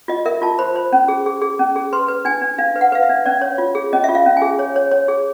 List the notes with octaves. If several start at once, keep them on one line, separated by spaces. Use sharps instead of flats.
F4 D#5
A#4 E5
F4 A5
C5 B5
C5
C#4
G#4
G#4
G#4
C#4
G#4
B4 C6
B4
D4 G#5
D4
D4 F5
B4
F#5
B4 F5
E5
D4
C#4 D5
C#5
F4
G#4
C#4 D#5
F4 E5
F5
C#4
G#5
G#4
C#5
C#5
C#5
G#4